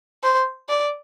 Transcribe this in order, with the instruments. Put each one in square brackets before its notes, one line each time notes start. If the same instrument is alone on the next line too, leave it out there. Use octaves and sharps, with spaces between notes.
[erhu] C5
D5